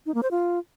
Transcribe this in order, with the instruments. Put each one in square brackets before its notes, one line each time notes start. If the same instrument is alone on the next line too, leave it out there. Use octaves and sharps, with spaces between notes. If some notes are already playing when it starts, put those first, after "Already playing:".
[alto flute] D#4
A#3
C5
F4